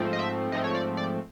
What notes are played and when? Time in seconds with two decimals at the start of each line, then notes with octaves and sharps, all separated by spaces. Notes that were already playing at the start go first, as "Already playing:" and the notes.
Already playing: G#2 F3 A3 C4
0.13 D#5
0.19 E5
0.52 G#2 F3 A3 C4 D#5
0.64 C#5
0.75 D5
0.97 D5